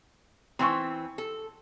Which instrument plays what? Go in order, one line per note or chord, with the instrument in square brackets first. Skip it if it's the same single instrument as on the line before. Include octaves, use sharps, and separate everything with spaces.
[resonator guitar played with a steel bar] E3 C4 [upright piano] C6 C#6
[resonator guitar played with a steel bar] A4